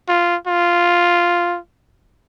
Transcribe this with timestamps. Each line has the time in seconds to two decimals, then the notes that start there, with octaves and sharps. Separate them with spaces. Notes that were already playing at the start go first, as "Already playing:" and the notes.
0.08 F4
0.47 F4